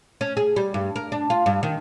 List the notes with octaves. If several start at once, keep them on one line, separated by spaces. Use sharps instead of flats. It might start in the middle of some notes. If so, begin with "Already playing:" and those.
C#4
G#4
G3
G2
A#4
D4
F4
G2
D#3